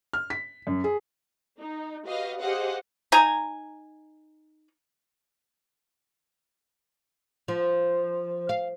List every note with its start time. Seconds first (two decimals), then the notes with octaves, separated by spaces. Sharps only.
0.13 F6
0.30 B6
0.67 F#2
0.84 G#4
1.59 D#4
2.06 F#4 G4 B4 D#5 F5
2.40 G4 G#4 C5 D#5 F5 F#5
3.12 D#4 G#5 A#5
7.48 F3
8.49 F5